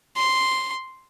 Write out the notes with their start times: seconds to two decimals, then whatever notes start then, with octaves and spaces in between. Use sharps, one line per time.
0.17 C6